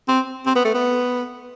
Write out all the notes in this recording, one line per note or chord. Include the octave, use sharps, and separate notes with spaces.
C4
C4
B3
A3
B3